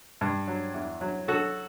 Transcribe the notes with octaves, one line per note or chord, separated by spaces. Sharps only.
G2
F#3
E2
F#3
F#3 F#4 A4